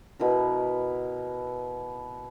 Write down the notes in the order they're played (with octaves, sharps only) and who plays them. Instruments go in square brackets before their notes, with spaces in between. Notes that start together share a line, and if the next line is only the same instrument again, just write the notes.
[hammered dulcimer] B2 E4 A#4